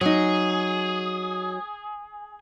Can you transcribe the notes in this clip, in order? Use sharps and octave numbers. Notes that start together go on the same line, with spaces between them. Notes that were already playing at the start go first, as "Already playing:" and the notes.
F#3 D#4 G#4